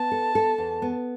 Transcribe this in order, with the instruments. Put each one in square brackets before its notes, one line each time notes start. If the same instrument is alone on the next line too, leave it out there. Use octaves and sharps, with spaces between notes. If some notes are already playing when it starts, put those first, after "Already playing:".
Already playing: [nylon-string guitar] B3 [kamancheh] A5
[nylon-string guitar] A4
A4
E2
B3